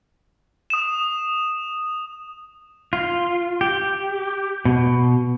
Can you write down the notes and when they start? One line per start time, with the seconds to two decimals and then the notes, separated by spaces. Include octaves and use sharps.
0.70 D#6 E7
2.93 F4
3.61 G4
4.65 B2